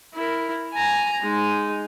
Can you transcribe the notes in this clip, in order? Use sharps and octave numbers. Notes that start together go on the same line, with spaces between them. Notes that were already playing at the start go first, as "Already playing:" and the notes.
E4 A#4
G#5 A#5
G#3 D#4